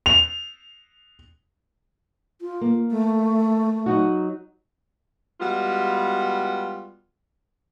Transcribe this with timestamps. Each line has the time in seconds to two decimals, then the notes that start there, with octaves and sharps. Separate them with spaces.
0.06 F7
2.41 F4
2.61 A#3
2.91 A3
3.86 F#3 D#4 F#4
5.41 G3 G#3 B3 F4 F#4